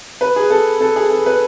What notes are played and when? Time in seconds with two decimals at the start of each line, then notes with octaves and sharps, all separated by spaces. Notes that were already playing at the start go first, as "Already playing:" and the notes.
0.21 B4
0.36 G#4
0.50 A4
0.81 A4
0.96 G#4
1.11 A4
1.26 B4